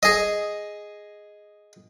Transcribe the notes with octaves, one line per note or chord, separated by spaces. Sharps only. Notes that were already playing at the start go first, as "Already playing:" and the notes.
G#4 D#5